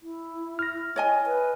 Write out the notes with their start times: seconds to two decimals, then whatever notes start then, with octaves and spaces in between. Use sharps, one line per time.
0.02 E4
0.59 F6 A#6
0.96 C#5 D#5 G#5
1.26 B4